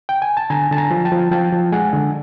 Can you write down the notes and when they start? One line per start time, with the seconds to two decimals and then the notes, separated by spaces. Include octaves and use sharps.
0.09 G5
0.22 G#5
0.37 A5
0.50 D3 G#5 A#5
0.71 D3 A5
0.77 G#5 A#5
0.91 F3
1.05 G5 A5
1.12 F3
1.31 F3 G5 A5
1.53 F3
1.72 G#3 F#5 G#5
1.93 D3